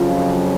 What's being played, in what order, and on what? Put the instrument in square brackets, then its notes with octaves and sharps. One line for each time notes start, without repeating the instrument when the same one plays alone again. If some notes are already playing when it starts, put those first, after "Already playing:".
Already playing: [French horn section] F2 C#3 F#3 F4